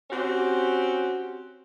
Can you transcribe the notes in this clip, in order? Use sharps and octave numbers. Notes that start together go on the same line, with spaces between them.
C4 C#4 F#4 G4